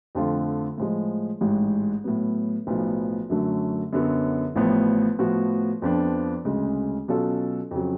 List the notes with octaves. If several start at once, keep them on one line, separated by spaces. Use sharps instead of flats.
F2 D3 F3 A3 F4
A2 F3 G#3
A1 G#2 G#3
A2 F#3 B3
B1 A2 F3 B3
F#2 D3 F#3 A3
F#2 D3 F#3 B3
A1 A2 F3 B3
A2 F3 B3 F#4
F2 F3 B3 D4
D2 C#3 G#3
B2 F#3 C#4 F4 A4
F2 C#3 F#3